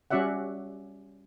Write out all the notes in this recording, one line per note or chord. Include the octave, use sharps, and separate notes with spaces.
G3 C#4 F#4 D5 E5 F#5